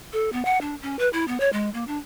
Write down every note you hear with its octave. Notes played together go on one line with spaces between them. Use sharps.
A4
B3
F#5
D4
C#4
B4
E4
B3
C#5
G#3
A#3
D4